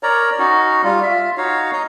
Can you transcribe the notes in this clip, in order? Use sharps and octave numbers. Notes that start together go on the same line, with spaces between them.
A#4 C#5 D5 A#5
C#4 D#4 F#4
G3 F4
F4 E5
D#4 F#4 C#5 F5
D#5 A#5